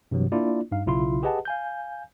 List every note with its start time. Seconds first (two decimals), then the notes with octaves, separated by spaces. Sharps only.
0.11 G2 C3 E3 F#3
0.32 A#3 D4 E4 F4 D5
0.71 G2 D#4 F5
0.86 B1 C#3 E4 F4 C6
1.23 G4 G#4 B4 D#5 F#5 A5
1.45 F5 G#5 G6